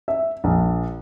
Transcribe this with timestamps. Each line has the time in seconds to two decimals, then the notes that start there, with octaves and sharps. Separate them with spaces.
0.08 E5
0.44 A#1